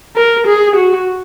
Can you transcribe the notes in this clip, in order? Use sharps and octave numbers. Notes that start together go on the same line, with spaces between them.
A#4
G#4
F#4